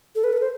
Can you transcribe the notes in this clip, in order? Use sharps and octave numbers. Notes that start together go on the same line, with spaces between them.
A4
B4
A4
B4
C5